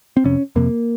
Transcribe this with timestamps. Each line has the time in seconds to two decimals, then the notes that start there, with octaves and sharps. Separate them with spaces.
0.17 C4
0.24 F2 C3 C#4
0.56 F2 C3 A#3